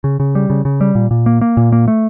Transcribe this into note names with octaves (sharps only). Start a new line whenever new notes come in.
C#3
C#3
G3
C#3
C#3
G3
A#2
A#2
A#3
A#3
A#2
A#3
A3